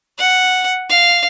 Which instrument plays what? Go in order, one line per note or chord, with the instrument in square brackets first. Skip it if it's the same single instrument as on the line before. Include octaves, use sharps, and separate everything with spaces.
[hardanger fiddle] F#5
F5